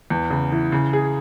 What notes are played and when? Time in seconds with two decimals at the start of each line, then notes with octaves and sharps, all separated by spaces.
0.10 E2
0.30 C#3
0.52 E3
0.72 C#3
0.93 G#4